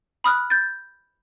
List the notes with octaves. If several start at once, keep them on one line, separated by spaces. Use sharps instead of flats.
B5 D#6 F6 F#6
G6 A6